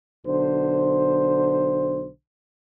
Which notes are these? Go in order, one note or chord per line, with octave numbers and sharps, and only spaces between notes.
B1 D3 C5